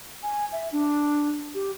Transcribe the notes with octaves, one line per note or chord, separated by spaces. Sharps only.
G#5
E5
D4
G4